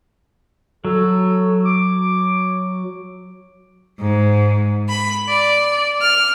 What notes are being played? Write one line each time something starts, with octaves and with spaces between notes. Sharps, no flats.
F#3 A4
D6
G#2
B5
D5
F6